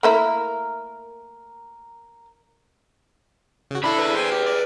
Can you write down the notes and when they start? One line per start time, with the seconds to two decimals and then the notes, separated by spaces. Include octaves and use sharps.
0.03 A3 A#3 E4 A#4
3.71 C#3 F#4
3.84 A#2 D4 E4 A4 B5
3.99 G#4 B4
4.15 C5 G5 G#5
4.32 G4
4.47 D5